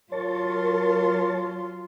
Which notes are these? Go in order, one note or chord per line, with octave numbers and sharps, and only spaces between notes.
F#3 F4 A#4 C#5 A5